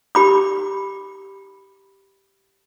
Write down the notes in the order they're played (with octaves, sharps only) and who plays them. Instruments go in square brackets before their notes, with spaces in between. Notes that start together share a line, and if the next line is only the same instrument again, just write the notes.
[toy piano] G4 B5 D6